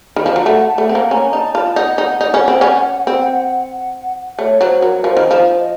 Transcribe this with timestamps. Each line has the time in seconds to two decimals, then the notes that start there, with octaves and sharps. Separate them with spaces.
0.16 D#3
0.26 F3
0.36 F#3
0.45 A3 F#5
0.61 F#5
0.68 A5
0.78 A3
0.89 C4 F#5
0.95 A#3
1.11 C#4 A#5
1.33 D#4 A5
1.55 F4 A5
1.76 D#4 F#5
1.98 D#4
2.21 D#4
2.34 C#4
2.48 C4
2.61 C#4
3.07 C4
4.39 A3 C#5
4.61 F#3 C5
4.82 F#3 A#4
5.04 F3 C5
5.17 D#3
5.31 F3
5.59 D#5